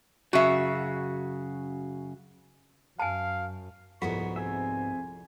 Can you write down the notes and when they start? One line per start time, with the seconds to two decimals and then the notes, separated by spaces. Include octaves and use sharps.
0.33 F#2 C#3 F#4 E5
2.99 F#2 F5 G#5 A5
4.02 C2 F2 G#2 B3 F#4 B5 C#6
4.36 C4 G#4 E5 G#5